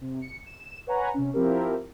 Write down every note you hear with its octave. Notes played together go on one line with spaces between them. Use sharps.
C3
C#7
E7
B4 C#5 F#5 G#5 A#5 B5
C3 C#4
F3 C4 E4 G4 A#4